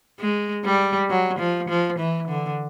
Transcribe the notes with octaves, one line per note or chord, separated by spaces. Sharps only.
G#3
G3
F#3
F3
F3
E3
D3